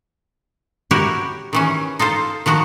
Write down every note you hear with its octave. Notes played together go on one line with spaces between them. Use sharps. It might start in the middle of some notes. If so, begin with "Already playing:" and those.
E4 F#4 G4 A#4 C#5
D#3 E3 C#4
D#4 F4 A4 C5
D#3 F3 F#4 A#5